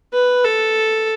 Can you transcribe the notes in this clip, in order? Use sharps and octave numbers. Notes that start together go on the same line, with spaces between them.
B4
A4